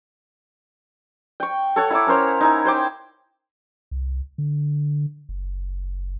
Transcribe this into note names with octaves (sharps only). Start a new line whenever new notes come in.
G5 C#6
A4 C#5 F#5
E4 E5 A#5 D6
C#4 A#4 C5 C#5
D#4 E4 G#5
C5 G5 D6
C2
D3
F#1